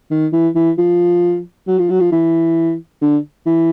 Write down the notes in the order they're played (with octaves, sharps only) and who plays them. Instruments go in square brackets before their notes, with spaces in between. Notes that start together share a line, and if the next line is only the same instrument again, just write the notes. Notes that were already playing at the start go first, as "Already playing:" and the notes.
[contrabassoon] D#3
E3
E3
F3
F#3
F3
F#3
F3
E3
D3
E3